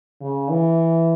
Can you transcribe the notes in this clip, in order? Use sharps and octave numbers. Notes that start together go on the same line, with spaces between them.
C#3
E3